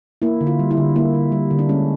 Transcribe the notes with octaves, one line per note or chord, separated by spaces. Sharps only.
A#3 E4
D3
F4
G3
E4
D3
A#3 E4
D3
G3
D3
D4
G#3 C#4